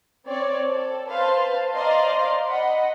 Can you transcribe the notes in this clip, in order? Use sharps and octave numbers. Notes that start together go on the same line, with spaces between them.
C4 C#5 D5
A4
B4 C5 F5 A5 C6
C5 D5 D#5 F5 A#5 C6
D#5 F#5 B5